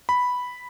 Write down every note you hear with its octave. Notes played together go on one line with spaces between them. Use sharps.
B5